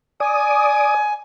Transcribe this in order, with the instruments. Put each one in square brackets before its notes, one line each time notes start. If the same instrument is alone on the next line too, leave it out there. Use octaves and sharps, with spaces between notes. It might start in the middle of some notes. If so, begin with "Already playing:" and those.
[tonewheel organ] D5 D#6 [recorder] G#5